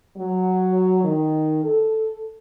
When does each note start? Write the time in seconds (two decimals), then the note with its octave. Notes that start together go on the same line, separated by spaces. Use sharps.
0.17 F#3
1.04 D#3
1.64 A4